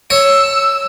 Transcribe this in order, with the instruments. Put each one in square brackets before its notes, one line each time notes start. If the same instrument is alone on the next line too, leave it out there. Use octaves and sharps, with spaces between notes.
[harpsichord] C#5 [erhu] E6